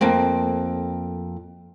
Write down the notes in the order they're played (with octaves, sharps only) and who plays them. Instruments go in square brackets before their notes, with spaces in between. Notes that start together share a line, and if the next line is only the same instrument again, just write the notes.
[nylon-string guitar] F2 A3 A#3 C4